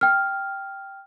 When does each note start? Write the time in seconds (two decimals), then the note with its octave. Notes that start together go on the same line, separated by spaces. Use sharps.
0.01 G5 F6